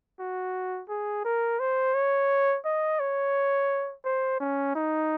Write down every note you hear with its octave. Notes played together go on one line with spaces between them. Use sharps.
F#4
G#4
A#4
C5
C#5
D#5
C#5
C5
C#4
D#4